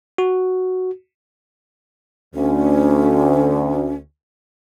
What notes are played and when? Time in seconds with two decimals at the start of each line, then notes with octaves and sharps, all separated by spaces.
0.18 F#4
2.35 D2 C#4